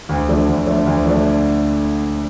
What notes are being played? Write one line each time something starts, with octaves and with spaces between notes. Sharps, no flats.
D2
D3 F3 A3 D4
D2
D3 F3 A3 D4
D2
D3 F3 A3 D4